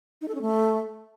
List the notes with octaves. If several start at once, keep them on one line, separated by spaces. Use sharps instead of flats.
D#4
A4
C#4
A3